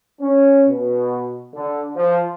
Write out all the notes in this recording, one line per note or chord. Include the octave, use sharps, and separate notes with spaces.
C#4
B2
D3
F3